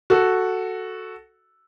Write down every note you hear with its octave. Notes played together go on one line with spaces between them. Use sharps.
F#4 A4